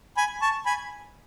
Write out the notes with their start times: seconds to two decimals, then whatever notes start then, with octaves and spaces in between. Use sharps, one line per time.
0.17 G#5 B5
0.42 A5 C#6
0.66 G#5 B5